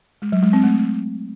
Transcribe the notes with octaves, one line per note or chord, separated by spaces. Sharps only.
G#3
F#3
G#3
C4
A3